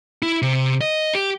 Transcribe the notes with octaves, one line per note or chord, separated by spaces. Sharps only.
E4
C3
D#5
G4